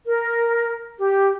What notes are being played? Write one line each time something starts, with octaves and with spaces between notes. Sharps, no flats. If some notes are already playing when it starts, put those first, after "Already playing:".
A#4
G4